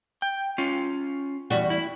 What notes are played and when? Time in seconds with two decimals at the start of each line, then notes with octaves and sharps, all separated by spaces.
0.22 G5
0.58 C#4 F4
1.50 E2 G3 F#4
1.70 E4